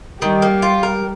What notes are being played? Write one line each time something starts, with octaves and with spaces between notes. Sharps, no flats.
D#3 G3 G4
A#3
F4
A#4